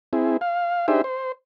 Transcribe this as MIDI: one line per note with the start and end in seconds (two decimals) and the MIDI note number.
0.13 0.37 60
0.13 0.37 64
0.13 0.37 68
0.41 0.86 77
0.88 1.01 62
0.88 1.01 63
0.88 1.01 67
0.88 1.01 68
0.88 1.01 72
0.88 1.01 76
1.04 1.32 72